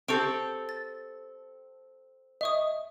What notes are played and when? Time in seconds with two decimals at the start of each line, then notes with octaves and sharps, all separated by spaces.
0.08 C4 G4 A4 C#6 D7
0.69 A6
2.41 D#5 E5 C#6 D#6